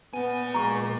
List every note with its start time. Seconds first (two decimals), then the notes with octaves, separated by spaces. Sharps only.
0.14 A#2 B3 G#5
0.54 G#3 A#5 C#6